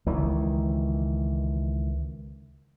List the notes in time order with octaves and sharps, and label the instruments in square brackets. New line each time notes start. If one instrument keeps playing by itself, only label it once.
[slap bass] C#2 D#3 E3